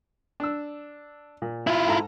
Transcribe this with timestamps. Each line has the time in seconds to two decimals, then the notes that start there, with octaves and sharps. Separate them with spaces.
0.40 D4 E6
1.42 A#2
1.67 E4 F4
1.87 G#2 A4 A#5